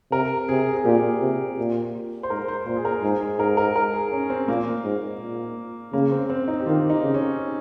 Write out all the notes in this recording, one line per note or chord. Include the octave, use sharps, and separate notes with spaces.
C3 A#4
C3 G#4
G#4
A#2 G4
C3
A#2
C5
G#2 A#4
C5
A#2 C5
G#4
A#4
G#2 G#4
G#4
G#2 A#4
A#4
A#4
G#4
C#4
C4
A#2 A#3
G#2
A#2
C#3 A#3
C4
C4
D#4
G4
D#3 F4
D#4
C#3
C#4